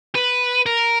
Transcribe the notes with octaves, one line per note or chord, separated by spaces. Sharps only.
B4
A#4